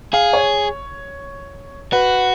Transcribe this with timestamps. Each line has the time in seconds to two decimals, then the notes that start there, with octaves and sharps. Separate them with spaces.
0.14 G#4 F5
0.33 C#5
1.92 F#4 B4